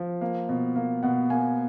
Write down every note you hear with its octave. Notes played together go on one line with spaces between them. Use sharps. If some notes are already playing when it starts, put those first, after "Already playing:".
Already playing: F3
A#3
B2
A#3
B2 F#5
A#3 G#5